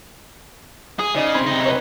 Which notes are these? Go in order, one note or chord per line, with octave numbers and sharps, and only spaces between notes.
G#4 D#6
C#3 D#4 D5 D#7
C4 B5 G#6
C3 D#4
B4 C#5